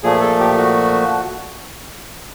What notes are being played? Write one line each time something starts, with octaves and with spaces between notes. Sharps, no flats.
A#2 F3 A3 G#4
A4
G4
F#4